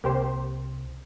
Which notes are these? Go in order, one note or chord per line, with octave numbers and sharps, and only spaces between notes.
C2 A#3 G4 C5